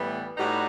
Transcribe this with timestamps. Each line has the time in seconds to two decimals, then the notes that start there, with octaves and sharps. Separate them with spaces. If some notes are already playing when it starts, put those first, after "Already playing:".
Already playing: A2 E3 G3 B3
0.37 A2 G3 D#4 F#4 B4